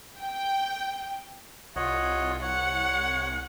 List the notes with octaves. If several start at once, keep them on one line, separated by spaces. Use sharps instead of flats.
G5
C2 F4 C#5 D#5 F#5
C#5 F#5